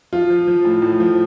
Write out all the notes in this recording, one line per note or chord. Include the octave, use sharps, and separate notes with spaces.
F3 F4
F3
F3
A2
A2
F3